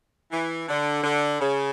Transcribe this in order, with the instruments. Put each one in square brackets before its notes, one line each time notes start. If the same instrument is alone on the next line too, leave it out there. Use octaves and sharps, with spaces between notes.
[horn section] E3
D3
D3
C#3